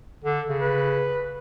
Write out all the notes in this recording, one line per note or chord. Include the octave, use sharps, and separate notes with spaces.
D3
C#3
B4